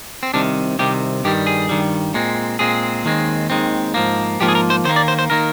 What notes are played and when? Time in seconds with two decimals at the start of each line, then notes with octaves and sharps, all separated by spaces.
0.23 C4
0.34 C2 C3 D#3 D4
0.79 C2 C3 D#3 G4
1.24 G2 D#3 G3 G4
1.47 G#4
1.69 G2 D#3 G3
2.14 A#2 G#3 C4
2.59 A#2 G#3 C4 G#4
3.05 D#2 D#3 G#3 C4
3.50 D#2 D#3 G#3 C4
3.94 G#2 F3 A#3
4.40 G#2 F3 A#3 G4
4.48 G#4
4.55 A#4
4.70 C5
4.85 D#2 D#3 A#3 C5
4.96 D5
5.08 C5
5.19 C5
5.30 D#3 A#3 A#4